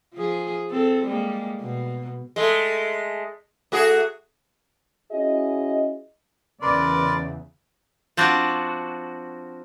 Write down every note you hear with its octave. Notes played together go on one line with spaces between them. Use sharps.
F3 G#4
C4 A4
G3 G#3 A#3
B2
G#3 A3
A3 F#4 G#4
C#4 E4 F#4 G#4 D#5
E2 C#3 A#4 B4 D5 C6
F3 C4 D4 F#4